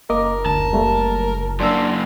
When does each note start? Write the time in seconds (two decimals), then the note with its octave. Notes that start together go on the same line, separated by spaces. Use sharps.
0.10 F#1 A#3 A#4 D#5 D6
0.46 D2 A5
0.73 G3 A3 A#3
1.60 F#2 A#3 D4 C6 E6